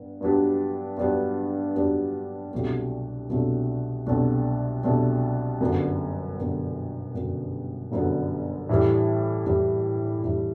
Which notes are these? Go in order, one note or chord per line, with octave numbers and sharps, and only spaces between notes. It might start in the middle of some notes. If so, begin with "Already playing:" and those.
Already playing: G2 B3
G2 F#3 B3 D4 G4
G2 F#3 B3 D4 G4
G2 F#3 B3 D4 G4
C2 B2 F#3 A3 D4
C2 B2 F#3 A3 D4
C2 B2 F#3 A3 D4
C2 B2 F#3 A3 D4
G1 F#2 D3 F#3 B3
G1 F#2 D3 F#3 B3
G1 F#2 D3 F#3 B3
G1 F#2 D3 F#3 B3
A2 E3 G3
A2 E3 G3
A2 E3 G3